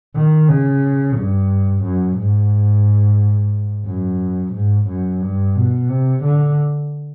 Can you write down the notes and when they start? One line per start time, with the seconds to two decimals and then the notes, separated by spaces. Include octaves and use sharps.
0.16 D#3
0.49 C#3
1.17 G2
1.84 F#2
2.18 G#2
3.86 F#2
4.54 G#2
4.88 F#2
5.22 G2
5.55 B2
5.88 C3
6.23 D3